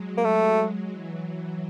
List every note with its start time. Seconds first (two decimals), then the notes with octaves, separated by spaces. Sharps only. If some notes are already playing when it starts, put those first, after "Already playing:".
Already playing: F#3 G#3
0.18 A#3
0.25 A3
0.90 E3 F#3